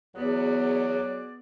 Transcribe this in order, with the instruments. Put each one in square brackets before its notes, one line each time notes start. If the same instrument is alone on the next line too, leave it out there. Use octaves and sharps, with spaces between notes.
[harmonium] E2 [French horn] F#3 [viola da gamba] B3 [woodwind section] F#4 G#4 D5